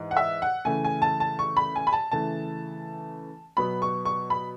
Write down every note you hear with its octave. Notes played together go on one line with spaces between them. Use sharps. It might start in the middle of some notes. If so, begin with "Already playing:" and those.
Already playing: G#2 E3
F#5
E5
F#5
C#3 E3 A3 G#5
G#5
A5
A5
C#6
B5
G#5
B5
A5
C#3 E3 A3 A5
B2 F#3 B3 B5
C#6
C#6
B5